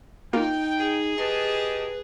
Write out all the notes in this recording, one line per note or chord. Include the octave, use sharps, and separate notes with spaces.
A#3 D#4 F4 A#4 G5
G#4
G4 B4 D#5 A5 C6